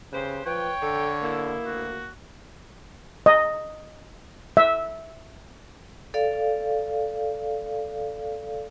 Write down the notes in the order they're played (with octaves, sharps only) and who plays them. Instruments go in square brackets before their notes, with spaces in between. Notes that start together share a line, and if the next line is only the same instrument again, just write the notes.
[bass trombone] C#3 [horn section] G4 B4 C5
[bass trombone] F3 [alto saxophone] B4 [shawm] C#5 [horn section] G5
[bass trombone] D3 [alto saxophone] A4
[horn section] B2 E4 [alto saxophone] A#3
[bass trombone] D2 [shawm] F#4
[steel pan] D#5
E5
[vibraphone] A4 D5 F5